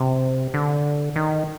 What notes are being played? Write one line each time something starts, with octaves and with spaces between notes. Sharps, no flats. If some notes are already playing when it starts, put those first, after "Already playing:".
Already playing: C3
D3
D#3